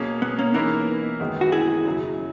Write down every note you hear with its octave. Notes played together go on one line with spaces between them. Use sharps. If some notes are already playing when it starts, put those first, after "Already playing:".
Already playing: B2 F#3 A#3 C#4 G#4
B3
A#3 C#4
E3 A#3 B3 D#4 E4 A#4
F#2 D#3 G#3 B3 D#4
F#4
E4 G#4
F#2 C#3 F#3